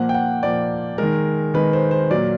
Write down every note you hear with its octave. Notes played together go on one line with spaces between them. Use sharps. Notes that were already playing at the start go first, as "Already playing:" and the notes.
Already playing: A#2 F3 A#3 F#5
G5
F#5
A#2 F3 A#3 D5
D#3 G#3 A#4
D#3 G#3 B4
C5
C5
A#2 F#3 A#3 D5